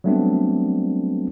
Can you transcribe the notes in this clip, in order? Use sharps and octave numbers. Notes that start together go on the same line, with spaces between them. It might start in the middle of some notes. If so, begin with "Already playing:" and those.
F#3 G3 A3 B3 C4 D4